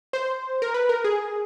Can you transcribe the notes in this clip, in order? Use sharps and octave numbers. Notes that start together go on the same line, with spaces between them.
C5
A#4
B4
A#4
G#4